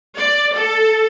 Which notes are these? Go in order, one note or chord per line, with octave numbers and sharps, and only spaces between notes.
D5
A4